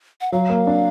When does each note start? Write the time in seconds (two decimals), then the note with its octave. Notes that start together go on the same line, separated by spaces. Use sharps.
0.21 F#5
0.32 F#3 F5
0.50 A#3
0.67 D4